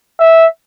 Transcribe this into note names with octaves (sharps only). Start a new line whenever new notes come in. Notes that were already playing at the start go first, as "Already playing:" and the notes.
E5